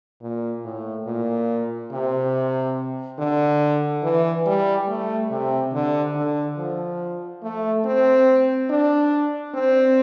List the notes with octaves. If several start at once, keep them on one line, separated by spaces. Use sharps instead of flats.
A#2
A2
A#2
C3
D3
E3
G3
A3
C3
D3
D3
F3
A3
C4
D4
C4